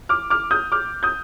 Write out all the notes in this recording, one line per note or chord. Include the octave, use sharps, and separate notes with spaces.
D6 F6
D6 F6
D#6 G6
D6 F6
D#6 G6